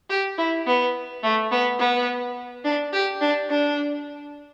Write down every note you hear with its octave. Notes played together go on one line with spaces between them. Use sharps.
G4
E4
B3
A3
B3
B3
D4
G4
D4
D4